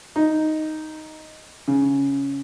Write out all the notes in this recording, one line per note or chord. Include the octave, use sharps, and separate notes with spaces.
D#4
C#3